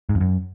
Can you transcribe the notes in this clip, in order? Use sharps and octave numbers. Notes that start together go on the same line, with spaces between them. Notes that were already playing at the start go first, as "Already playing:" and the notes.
G#2
F2
F#2